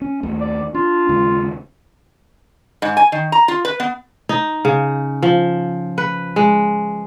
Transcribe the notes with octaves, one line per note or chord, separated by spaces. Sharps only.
C#4
D#2 A3
D5
D4 F4
D#2 C#3 G#3
G#2
G#5
D#3
A#5
F4
B4
B3
D#4
C#3
F3
B4
G#3